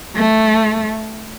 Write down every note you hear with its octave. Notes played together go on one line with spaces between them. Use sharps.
A3